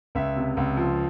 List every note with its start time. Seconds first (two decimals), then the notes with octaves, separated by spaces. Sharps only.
0.15 C#2 E5
0.36 C3
0.57 C#2
0.77 F3